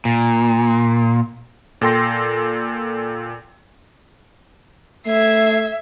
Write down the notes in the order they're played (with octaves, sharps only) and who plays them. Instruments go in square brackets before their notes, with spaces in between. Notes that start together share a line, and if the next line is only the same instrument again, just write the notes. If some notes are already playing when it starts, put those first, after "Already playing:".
[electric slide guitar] A#2
[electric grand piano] A#2 A4 G5 C6 A#6
[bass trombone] A3 [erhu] E5 [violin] G#6 C7